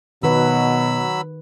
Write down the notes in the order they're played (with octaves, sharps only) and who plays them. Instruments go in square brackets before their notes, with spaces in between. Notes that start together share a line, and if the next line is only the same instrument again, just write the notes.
[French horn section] B2 [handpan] D#3 B4 [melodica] F#3 B5 E6